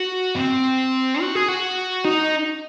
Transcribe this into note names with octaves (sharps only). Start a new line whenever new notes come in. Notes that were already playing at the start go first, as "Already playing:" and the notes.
Already playing: F#4
C4
F#4
G#4
F#4
D#4